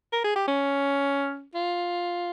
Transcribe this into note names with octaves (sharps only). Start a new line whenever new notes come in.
A#4
G#4
G4
C#4
F4